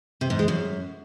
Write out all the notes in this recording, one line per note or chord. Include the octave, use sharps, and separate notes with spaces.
C3
G#2
G#3
F#2